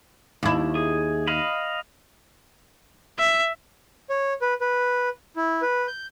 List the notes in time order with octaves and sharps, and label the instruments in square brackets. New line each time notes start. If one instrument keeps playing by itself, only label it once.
[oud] D#2 E4
[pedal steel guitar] G#4
D#5 F5 B5
[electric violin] E5
[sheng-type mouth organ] C#5
B4
B4
E4
B4
G6